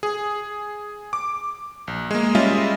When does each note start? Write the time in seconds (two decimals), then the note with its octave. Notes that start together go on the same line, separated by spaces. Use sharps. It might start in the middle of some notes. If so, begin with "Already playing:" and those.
0.03 G#4
1.13 D6
1.88 A#1
2.11 G#3 A#3
2.35 G3 G#3 C#4 F4 D#5 E5